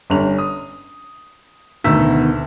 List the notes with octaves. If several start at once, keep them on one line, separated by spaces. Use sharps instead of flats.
G1 C#4 F7
D#6
D2 B2 D#3 E6 B6